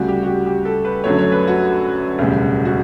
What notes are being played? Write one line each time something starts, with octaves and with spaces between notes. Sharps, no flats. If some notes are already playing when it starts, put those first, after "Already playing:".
Already playing: D2 C#3 G3 F#4
G4
F#4
G4
G4
A4
B4
F#2 D3 F#3 A3 C#5
C#5
B4
F#4
E1 D2 C#3 G3
F#4